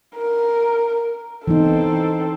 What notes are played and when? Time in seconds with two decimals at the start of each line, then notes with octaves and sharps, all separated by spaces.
0.16 A#4
1.48 E3 B3 C4 D#4 A4